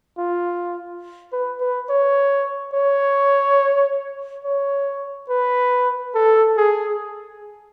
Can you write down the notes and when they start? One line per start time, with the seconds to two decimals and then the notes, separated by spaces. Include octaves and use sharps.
0.18 F4
1.32 B4
1.60 B4
1.89 C#5
2.74 C#5
4.45 C#5
5.29 B4
6.14 A4
6.57 G#4